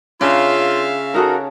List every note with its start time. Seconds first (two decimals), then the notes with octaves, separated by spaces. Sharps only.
0.21 C#3 D4 F4 E5 F5
1.14 D#4 F#4 A4 A#4